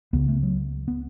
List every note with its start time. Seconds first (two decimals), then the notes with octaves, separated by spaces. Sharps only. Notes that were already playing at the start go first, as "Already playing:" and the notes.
0.13 C#2 C#3 B3
0.28 A3
0.43 F#3
0.88 B3